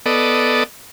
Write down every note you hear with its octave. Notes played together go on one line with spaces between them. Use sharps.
B3 A4 D5 D#5